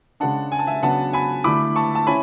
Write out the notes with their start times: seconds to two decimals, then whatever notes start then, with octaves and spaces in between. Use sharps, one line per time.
0.20 C#3 G#3 D4 F#5 A5
0.52 G#5
0.59 A5
0.67 E5 G#5
0.83 C#3 F#3 B3 D4 F#5 A5
1.13 G#5 B5
1.44 D3 A3 E4 B5 D6
1.76 A5 C#6
1.95 A5
2.07 C#4 E4 G#5 B5